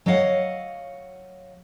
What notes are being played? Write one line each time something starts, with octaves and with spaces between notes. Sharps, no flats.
F#3 C#5 D#5 F5 F#5